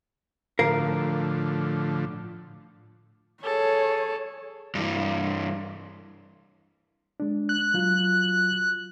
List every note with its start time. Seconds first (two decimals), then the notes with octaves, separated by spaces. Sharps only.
0.59 A2 D3 F3 A#4 F5
3.44 G#4 A4 C#5
4.75 G2 E3
7.20 G#3 D4
7.49 F#6
7.74 F#3 F4